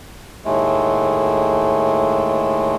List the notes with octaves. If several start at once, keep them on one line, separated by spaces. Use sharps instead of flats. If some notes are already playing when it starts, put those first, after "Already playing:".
D#2 A2 G#3 A3